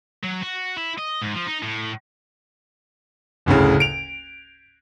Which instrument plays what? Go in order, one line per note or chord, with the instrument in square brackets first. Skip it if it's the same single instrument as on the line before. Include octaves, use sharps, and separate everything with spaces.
[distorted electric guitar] F#3
F#4
E4
D#5
G#2
F3
D#4
A2
[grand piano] F#1 D2 A2 C#3
D7 F7